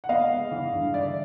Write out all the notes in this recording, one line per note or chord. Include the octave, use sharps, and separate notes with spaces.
F#5
B3 D#5 F5
G#3
E3
G2
D3 D5 E5